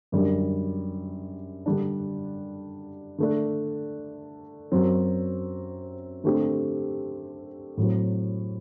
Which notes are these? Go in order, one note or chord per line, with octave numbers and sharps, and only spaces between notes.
F#2 D3 G3
D3 G3 D4
D3 A3 D4
F#2 F#3 C4
D3 A3 C4 G4
A2 F#3 C4